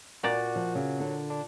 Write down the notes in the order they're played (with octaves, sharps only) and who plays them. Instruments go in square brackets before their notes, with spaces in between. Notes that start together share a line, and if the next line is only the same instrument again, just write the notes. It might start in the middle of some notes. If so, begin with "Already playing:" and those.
[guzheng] A#2 D5 A#5 [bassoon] F#4
[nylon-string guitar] F3
[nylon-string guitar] C#3 [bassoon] F#3
[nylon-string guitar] D3
[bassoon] D4